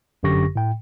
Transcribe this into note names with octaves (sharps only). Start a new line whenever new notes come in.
G1 F#2 D3 G4 C#6 A#6
A2 G5